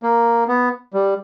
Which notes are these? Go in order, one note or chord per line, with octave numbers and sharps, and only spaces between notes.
A#3
B3
G3